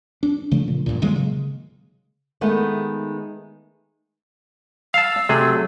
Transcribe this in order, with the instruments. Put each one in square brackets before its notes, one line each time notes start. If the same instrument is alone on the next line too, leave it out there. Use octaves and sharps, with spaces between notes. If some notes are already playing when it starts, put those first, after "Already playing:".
[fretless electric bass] D4
C#3 F3 A3 D4
A#2
E1 C2 G2 A#2
D#3 F#3 G#3 A#3
C#3
[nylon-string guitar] D#3 G#3 A3 B3
[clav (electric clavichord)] F5 A5 [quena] E6
[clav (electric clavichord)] C3 G#4 [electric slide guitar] F#3 A3